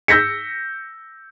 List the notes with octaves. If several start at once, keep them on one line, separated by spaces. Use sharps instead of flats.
E6 G6 A#6 B6 C#7